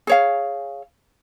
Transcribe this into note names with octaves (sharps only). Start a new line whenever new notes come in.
G#4 C#5 F5